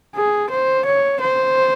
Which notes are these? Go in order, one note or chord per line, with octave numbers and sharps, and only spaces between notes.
G#4
C5
C#5
C5